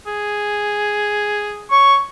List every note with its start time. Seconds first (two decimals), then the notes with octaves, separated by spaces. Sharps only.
0.07 G#4
1.71 C#5 C#6